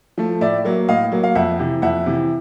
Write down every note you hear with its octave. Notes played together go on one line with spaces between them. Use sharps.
F3 A3
A2 D5 E5
F#3 A#3
A2 D#5 F5
F#3 A#3
F5
F2 E5 F#5
C3 E3
F2 E5 F#5
C3 E3